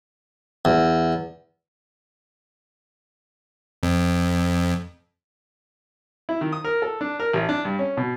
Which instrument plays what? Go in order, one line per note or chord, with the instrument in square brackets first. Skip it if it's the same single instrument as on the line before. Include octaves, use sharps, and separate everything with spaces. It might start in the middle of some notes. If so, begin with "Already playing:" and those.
[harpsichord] E2
[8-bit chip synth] F2
[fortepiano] E4
D#3
D#6
A#4
A4
D4
A#4
A1
D4
G2
C#4
B2